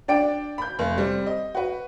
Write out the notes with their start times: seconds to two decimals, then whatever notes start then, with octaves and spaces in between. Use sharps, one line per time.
0.08 D4 D5 G5 D7
0.58 B5 G6
0.79 F1
0.98 G3 C4
1.26 D#5
1.55 F#4 B4